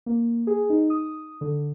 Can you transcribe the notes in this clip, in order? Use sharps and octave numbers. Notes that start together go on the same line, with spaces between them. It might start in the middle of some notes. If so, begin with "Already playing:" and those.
A#3
G#4
D#4
D#6
D3